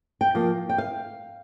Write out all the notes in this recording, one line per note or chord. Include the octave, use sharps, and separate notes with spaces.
G5
F3 A#3
G5
F5